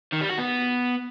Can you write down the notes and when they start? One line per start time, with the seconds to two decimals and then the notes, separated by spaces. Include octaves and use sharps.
0.13 D#3
0.22 G3
0.30 F#4
0.39 B3